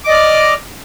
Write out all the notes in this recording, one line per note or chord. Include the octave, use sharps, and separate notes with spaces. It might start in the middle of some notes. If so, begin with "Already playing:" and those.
D5 D#5 D6 F6